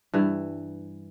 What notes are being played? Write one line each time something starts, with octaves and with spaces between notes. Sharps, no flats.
G2 E3